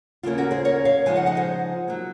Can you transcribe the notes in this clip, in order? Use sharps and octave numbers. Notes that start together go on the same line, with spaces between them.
D#2 C#3 F3 A#3 C#4 F4
F#4 A#4
G#4 C5
A#4 C#5
C#5 F5
C#3 F3 G#3 D#4 F5 G#5
D#5 F#5
D#5 F#5
G#4 C5
F#3 A#3